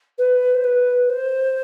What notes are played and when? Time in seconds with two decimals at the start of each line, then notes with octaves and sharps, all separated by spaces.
0.18 B4
0.54 C5
0.64 B4
1.09 C5